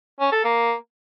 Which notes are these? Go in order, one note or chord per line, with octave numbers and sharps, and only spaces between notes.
C#4
A4
A#3